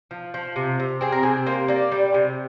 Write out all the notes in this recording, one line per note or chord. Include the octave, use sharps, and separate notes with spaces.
F3
F3
C3
C3
C4 G#4
A#4
C3 G#4
A#3 C5
A#3 D5
G3
C3